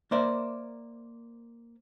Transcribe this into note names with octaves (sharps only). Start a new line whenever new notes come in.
A#3 A#4 C5 D5 E5